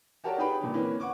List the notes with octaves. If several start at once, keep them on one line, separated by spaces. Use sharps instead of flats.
F#4 G4 A4 A#4 C#5 D5
D#4 G4 G#4 B4 G5 B5
A#2 D3
E3 A#3 C4 C#4 B4
F#5 C#6 D6